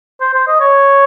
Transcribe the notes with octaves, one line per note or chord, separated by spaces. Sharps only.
C5
C5
D#5
C#5